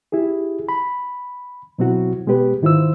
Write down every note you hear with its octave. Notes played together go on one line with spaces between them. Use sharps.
E4 G4 G#4
B5
B2 F#3 C4 E4 F#4
B2 G#3 B3 G4 B4
G#2 D#3 E4 F4 C5 E6